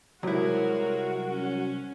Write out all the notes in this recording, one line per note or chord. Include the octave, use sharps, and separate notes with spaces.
C2 F#3 G#3 E4 F#4 A#4
C#4